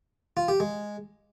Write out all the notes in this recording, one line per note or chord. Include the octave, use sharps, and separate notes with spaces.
F4
G4
G#3